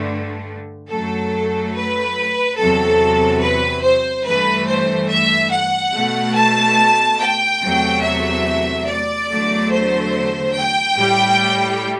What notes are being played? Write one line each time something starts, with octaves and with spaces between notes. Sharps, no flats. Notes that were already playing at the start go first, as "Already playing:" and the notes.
Already playing: G2 D3 A3
F#2 F#3 A3 A4
B4
E2 C3 F#3 A4
B4
C5
G2 E3 A3 B4
C5
E5
F#5
B2 A3
A5
G5
E2 C3 F#3 A3
E5
D5
E2 D3 F#3 A3
C5
G5
A2 G3